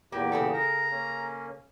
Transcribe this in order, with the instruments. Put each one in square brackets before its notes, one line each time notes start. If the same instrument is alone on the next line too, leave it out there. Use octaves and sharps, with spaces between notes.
[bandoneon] E2 A#2 G4 [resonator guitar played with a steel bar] A#3
[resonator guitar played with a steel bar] C#3 G#4 A4
[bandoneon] A#4 [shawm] A#5
[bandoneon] A#3 C#4